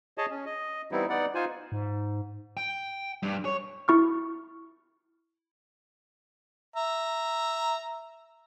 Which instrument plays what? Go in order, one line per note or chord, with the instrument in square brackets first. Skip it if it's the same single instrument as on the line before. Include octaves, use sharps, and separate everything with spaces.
[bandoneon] G#4 C#5 D#5 A5
C#4
D#5
E3 G3 B3 C4 D#4 E4
B3 D#4 D5 F#5
D#4 F4 C5 G#5
[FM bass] G#2
[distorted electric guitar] G5
G2
C#5
[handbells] E4 C#6 F6
[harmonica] E5 A#5